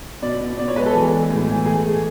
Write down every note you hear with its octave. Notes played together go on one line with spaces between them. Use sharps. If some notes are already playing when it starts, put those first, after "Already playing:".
B2 D5
B2
B2 D5
C#5
G#3 B4
A4
E3
G#3
A2
E3
A3 G#4
A3